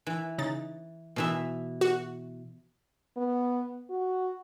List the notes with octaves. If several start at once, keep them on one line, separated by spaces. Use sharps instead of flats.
E3
C#3 D#4 A6
B2 E3 E5
F#4
B3
F#4